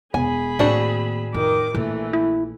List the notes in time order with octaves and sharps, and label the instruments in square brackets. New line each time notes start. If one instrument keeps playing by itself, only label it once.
[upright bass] E1 [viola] G#4 B5 [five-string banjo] G#5
[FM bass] A2 [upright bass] D#3 A#3 [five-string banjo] C4 D4 F#4
[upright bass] F2 [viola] D#3 D6
[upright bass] A#1 [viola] E3 A3
[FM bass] E4